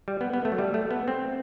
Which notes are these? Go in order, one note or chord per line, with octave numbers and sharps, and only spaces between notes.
G3
B3
B3
A3
F#3
G3
A3
B3
C4